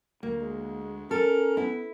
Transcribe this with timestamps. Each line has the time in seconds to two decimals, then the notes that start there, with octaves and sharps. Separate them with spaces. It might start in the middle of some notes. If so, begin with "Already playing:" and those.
0.23 D2 A#3
0.41 G#3
1.11 C#4 A4 A#4
1.57 B3 E4